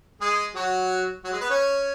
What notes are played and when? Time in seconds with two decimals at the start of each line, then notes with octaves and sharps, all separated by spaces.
0.21 G#3 G#4
0.55 F#3 F#4
1.24 F#3 F#4
1.32 G#3 G#4
1.41 B3 B4
1.50 C#4 C#5